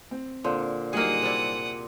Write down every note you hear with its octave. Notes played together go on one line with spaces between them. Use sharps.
C4
A#2 D3 C5
F#3 G3 A#3 D#4 G#4 F#5 D#6
C3 E4 D5